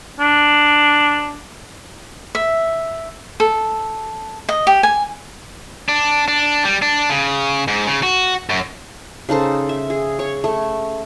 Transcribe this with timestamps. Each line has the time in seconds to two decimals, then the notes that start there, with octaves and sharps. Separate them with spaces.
0.20 D4
2.35 E5
3.40 A4
4.49 D#5
4.67 G4
4.83 G#5
5.89 D4
6.28 D4
6.65 G3
6.82 D4
7.10 C#3
7.68 G#2
7.87 C#3
8.03 F#4
8.50 F#2
9.29 C#3 D#4 A4 C5
9.69 E5
9.90 G#4
10.19 C#5
10.44 A3